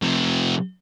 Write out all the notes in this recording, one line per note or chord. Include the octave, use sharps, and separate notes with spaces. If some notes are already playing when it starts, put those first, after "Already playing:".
C3 F3